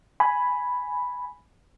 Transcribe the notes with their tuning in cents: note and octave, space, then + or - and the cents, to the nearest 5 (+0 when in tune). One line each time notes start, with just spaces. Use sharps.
G#5 +0 B5 +0